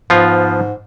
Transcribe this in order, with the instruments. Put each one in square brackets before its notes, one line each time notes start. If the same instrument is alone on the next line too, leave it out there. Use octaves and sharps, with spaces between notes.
[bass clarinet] G#2 [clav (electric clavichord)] F3 B3 F4